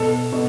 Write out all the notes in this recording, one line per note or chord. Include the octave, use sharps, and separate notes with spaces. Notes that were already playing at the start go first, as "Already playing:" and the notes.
Already playing: B2 A4
B2